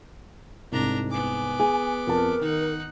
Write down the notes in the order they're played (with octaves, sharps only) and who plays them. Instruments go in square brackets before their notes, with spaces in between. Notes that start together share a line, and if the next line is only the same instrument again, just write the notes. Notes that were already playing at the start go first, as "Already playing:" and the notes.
[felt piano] C2 G#2 [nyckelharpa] D4 A#5
[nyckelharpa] B3 D6 [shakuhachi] G#5
[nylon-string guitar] G#4
[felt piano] F2 A5 [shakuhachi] A#4
[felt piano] D#3 [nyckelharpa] D#4 F#5